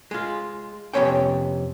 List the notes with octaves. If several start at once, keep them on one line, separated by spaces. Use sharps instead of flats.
G#3 F4
F2 C3 B3 C#4 C#5 G5